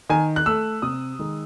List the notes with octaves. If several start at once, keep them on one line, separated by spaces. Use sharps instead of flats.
D#3 G#5
F#6
A3 E6
C3 D#6
D#3 G#3